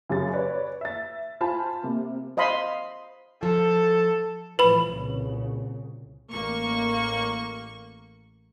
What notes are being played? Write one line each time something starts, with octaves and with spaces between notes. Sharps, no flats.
F#2 C#3 G4 A6
B4 C#5 D5
E5 A6
F4 C5 G#5 A5 B5
C3 A#3
C5 D#5 F5 B5 C6
F3 A4
A2 E3 F3 B4 B5
C2 A#2 C#3
A1 A#3 C#6